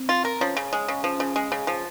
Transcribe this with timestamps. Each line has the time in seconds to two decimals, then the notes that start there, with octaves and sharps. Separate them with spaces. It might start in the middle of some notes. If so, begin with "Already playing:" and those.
Already playing: C4
0.09 F4
0.25 A#4
0.41 F3 C#4
0.57 C#3
0.73 G#3
0.88 C#3
1.04 F3
1.20 C#3
1.36 G#3
1.52 C#3
1.67 F3